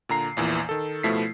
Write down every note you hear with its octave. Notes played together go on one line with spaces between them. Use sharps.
A#2 D3 A#5 C7
A#1 E2 A#2 E3
D#3 A4
B2 F3 A3 E4 B6 C7